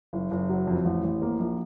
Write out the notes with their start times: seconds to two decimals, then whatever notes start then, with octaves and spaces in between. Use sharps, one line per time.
0.13 F#1
0.31 F#1
0.49 F#3
0.67 F2
0.85 A1
1.04 A1
1.22 A#3
1.39 A#1